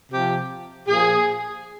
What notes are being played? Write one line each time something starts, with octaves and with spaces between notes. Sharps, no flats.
C3 F3 G4
A#2 F3 G#4